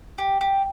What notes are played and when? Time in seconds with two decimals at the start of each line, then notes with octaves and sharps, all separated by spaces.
0.18 G4
0.41 G4